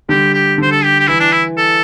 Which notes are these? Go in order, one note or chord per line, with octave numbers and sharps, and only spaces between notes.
D3 G3 G4
G4
D3 C5
A4
G4
G4
E3 E4
D4
E4
A4